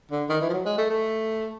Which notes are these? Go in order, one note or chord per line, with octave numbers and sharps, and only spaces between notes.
D3
D#3
E3
F3
F#3
G#3
A3
A3